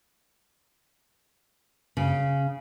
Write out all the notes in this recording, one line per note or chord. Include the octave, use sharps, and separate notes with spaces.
C#3